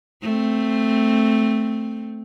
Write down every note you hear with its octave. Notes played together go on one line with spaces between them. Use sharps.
A3 C4